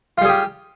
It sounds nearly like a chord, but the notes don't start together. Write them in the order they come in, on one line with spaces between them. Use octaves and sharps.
F4 G3 G#4 G4